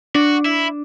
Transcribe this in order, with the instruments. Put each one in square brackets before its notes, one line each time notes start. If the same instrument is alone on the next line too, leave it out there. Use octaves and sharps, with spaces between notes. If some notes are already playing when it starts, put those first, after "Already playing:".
[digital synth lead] D4 [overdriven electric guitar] F#4
[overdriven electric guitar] E4